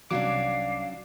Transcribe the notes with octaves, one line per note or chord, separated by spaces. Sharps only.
C2 F#3 C#4 D4 F5 D6